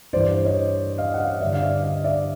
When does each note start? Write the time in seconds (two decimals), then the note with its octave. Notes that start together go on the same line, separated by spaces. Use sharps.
0.13 G2 E3 C5 D5
0.45 C#5 D#5
0.98 D#5 F5
1.14 F#5
1.19 D#5 F5
1.41 G2 D5 E5
1.44 D3
1.54 F5
1.62 D5 E5
1.83 D#5 F5
2.04 D5 E5